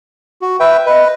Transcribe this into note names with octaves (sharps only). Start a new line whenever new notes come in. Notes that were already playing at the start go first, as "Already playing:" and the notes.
F#4
B4 E5 G5
B4 D#5